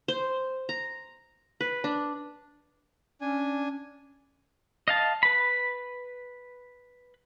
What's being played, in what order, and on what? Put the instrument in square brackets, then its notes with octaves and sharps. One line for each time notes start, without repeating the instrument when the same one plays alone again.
[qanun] C5
A#5
B4
D4
[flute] C#4 [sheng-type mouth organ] D4 G#5
[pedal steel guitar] D#5 F5 A5
B4 B5